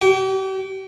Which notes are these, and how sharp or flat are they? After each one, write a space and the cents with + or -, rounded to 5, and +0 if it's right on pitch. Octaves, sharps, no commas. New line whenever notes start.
G4 -40 G5 +30